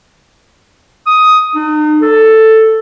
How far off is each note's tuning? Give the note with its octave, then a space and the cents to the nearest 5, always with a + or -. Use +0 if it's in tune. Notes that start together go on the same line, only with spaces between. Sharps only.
D#6 +10
D#4 -40
A4 +5